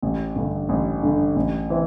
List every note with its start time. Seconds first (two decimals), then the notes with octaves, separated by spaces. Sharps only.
0.03 A1
0.36 G2 D3
0.69 A1
1.03 G2 D3
1.36 A1
1.70 E3 C4